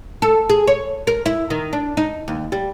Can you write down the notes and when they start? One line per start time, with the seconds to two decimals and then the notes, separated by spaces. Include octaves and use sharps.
0.22 A4
0.50 G#4
0.68 C#5
1.07 A#4
1.26 E4
1.50 D#3
1.73 D4
1.97 D#4
2.28 D#2
2.52 G3